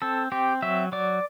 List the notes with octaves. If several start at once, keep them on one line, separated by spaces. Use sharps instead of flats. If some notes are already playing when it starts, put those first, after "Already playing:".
C4 A4
C4 G4
F#3 E5
F#3 D5